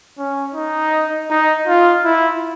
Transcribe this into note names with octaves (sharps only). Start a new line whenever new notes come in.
C#4
D#4
D#4
F4
E4